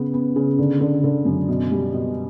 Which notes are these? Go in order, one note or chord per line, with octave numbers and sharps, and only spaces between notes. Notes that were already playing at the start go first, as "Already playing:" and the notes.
Already playing: C#3 B3
B3
C#3
D3
D3
D3
F#2
B2
G3
B2